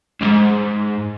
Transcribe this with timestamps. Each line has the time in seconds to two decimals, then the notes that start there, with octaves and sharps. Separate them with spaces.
0.21 C#2 G#2